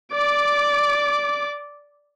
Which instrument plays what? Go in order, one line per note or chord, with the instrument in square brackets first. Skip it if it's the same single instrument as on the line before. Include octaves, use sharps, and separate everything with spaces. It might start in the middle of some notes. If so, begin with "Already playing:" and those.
[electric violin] D5 D6